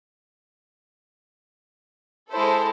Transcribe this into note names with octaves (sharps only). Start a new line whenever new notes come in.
G#3 E4 A4 C5